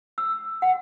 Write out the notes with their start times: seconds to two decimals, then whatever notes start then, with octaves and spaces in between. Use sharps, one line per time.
0.18 E6
0.62 F#5